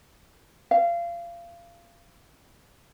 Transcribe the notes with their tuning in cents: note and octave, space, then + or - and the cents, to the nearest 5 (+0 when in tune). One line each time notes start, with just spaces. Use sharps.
F5 -25